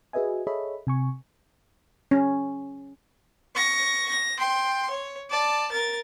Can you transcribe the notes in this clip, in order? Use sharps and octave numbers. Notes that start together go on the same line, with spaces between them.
F#4 G#4 B4 D#5 E5 G#5
G#4 A4 C#5 D#5 E5 B5
C3 G#5 C#6
C#4
C#6 A#6
A#6
G5 C6
C#5
D5 A5
A#4 A6